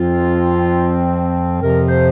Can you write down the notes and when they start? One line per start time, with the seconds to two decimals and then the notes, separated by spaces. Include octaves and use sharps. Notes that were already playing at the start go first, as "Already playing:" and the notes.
Already playing: F2 F3 C4 F4
1.61 F2 C3 F3 A#4
1.88 C5